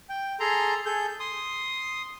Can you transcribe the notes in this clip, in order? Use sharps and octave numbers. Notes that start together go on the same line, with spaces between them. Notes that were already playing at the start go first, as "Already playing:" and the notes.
G5
G#4 A4 A#5 C6
G#4 A4 G6
C6 D#6